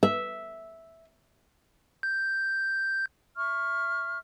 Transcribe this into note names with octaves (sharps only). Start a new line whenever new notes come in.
E5
G6
E5 C#6 F6